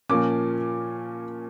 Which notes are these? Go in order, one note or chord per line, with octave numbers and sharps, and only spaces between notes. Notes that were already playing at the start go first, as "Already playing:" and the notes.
A#2 F3 A#3 C#4 D6